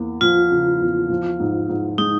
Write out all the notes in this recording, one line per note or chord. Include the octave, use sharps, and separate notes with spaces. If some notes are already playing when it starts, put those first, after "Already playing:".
Already playing: E2 A#3
F3 F4
C#3
E2
F3
G#2
G#2
G#3 D#4